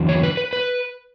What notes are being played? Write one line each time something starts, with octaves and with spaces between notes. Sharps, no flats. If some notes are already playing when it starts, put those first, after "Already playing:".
Already playing: E2 D3 F#3
C#5
B4
B4
B4